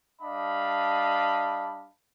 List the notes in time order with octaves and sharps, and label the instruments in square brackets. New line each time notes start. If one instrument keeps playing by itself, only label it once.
[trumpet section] G3 D4 D#5 F5 A5 B5